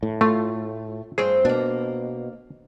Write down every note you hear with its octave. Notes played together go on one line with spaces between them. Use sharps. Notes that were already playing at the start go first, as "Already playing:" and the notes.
A2
A3 F4
G2 C4 G#4 C#5
B2 A#3 D4